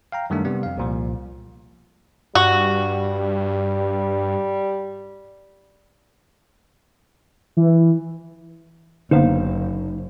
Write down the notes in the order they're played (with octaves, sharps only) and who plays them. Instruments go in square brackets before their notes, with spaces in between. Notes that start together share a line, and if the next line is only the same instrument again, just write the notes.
[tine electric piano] F5 G5 A#5
F#2 D#3 G3 A3 D4
C3 G3 B3
F2 F5
C2 A#2 F3
[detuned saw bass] G2 [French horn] G3 [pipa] F#4
[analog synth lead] E3
[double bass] F#1 [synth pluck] D3 A#3 B3 [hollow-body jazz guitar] D#4 C5 F5